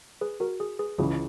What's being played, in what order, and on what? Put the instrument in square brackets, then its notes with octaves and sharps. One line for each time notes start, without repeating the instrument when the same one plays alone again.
[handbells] G#4 B4
F#4 A#4
G#4
G#4 B4
[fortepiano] C#2 C#3 E3 [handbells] G#4